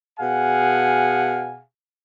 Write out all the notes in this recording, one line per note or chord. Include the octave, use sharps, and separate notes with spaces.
B2 G#4 F5 F#5 G#5